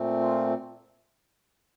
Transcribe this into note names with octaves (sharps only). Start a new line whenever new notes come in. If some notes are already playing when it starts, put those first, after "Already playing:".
Already playing: A#2 A3 C4
F4